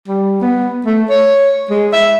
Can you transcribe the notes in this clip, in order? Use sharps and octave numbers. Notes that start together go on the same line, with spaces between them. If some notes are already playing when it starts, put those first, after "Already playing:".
G3
B3
A3
C#5
G#3
E5